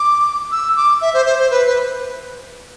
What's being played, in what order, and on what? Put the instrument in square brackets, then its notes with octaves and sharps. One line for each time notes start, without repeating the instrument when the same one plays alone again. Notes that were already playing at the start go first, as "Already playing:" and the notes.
Already playing: [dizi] D6
E6
D6
E5
C5
C5
C5
B4
B4